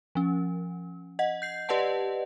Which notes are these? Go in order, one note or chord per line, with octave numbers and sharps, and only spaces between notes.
F3 C#4
D#5 F#5
G6 C7
G4 B4 D5 D#5 F#5 A5